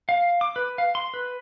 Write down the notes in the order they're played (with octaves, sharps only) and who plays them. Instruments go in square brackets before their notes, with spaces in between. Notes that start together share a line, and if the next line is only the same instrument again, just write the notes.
[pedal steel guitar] F5
D6
B4
F5
C6
B4